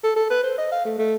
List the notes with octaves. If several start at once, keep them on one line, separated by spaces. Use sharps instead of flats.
A4
A4
B4
C5
D#5
F5
A3
A3